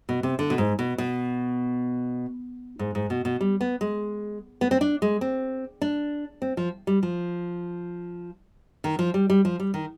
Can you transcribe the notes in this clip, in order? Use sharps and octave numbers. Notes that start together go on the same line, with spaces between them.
B2
C3
D3
B2
G#2
B2
B2
G#2
G#2
B2
B2
G3
B3
G#3
B3
C4
D4
G#3
C4
D4
C4
F3
G3
F3
D#3
F3
G3
G3
F3
G3
D#3